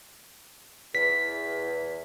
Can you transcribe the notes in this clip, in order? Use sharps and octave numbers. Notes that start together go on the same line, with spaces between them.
E2 B6